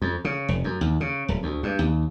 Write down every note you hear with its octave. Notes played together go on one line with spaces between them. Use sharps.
F2
C#3
F1
F#2
D#2
C#3
D1
D2
G2
D#2